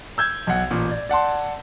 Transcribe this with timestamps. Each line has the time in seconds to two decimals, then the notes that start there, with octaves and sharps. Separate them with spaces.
0.18 E6 G6 G#6
0.47 B1 F#5
0.70 A1 A#2
0.91 D5
1.09 D5 F#5 A5 C6